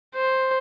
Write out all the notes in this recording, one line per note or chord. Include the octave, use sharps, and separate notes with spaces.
C5